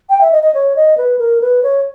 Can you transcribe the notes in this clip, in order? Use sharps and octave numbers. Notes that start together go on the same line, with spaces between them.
G5
E5
D#5
D#5
C#5
D#5
B4
A#4
B4
C#5